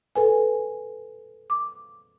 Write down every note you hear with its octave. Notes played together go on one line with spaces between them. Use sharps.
A4 B4 G#5
D6